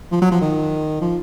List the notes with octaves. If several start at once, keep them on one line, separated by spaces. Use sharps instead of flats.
F3
F#3
F3
D#3
F3